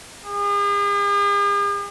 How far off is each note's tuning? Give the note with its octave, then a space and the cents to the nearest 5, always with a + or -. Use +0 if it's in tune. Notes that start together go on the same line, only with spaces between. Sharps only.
G#4 -45